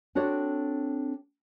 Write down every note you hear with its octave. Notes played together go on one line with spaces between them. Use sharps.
C4 D4 F#4 A4 C#5 D5